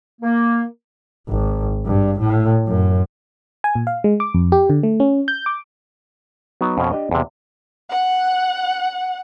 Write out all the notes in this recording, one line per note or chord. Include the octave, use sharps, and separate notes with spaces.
A#3
G#1
G2
A2
F#2
G#5
A#2
F5
G#3
D6
F2
G4
D3
A3
C#4
G6
D6
F#3 B3 D#4
F2 B2 C#4
D4 G4 D5 D#5
E2 C3
F#5